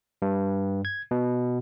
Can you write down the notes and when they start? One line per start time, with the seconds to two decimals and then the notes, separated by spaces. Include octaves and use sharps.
0.22 G2
0.85 G#6
1.11 B2